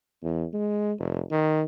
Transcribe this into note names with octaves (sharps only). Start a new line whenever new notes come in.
E2
G#3
F1
D#3